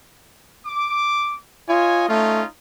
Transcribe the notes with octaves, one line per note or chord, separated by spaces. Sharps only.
D6
F4 C#5 D#5 G#5
A3 C#4 D#4 F4